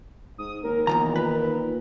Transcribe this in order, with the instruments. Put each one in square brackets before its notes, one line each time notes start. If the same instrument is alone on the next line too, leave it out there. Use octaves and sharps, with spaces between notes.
[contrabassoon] G#2 [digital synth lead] D#6
[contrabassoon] D#2 [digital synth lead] A#4
[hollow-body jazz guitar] E2 G2 A#5 [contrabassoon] A#2 [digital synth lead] D#3
[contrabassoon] A#2 [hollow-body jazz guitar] B4